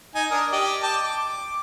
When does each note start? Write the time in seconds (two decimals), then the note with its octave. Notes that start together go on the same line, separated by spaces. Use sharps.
0.15 D#4 G#5
0.31 D4 A#4 D#6
0.52 G4 D5 D#5
0.83 G5 A5 D6
1.04 D6